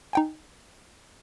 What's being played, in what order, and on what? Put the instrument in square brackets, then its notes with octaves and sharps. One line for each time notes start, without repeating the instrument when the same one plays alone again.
[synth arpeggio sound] D#4 G5 G#5